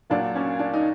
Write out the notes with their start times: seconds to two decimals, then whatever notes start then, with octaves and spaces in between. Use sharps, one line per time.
0.10 A#2 F#3 A#3 D4
0.35 C#4
0.59 D4
0.73 D#4